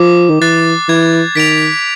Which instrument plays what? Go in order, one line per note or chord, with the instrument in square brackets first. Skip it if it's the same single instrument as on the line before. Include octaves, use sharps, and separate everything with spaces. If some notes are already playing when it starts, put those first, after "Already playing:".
Already playing: [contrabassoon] F3 [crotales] D6
[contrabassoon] D#3
[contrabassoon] E3 [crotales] F#6 A6 C7
[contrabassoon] E3 [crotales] G#6
[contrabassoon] D#3 [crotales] B6 D7 F7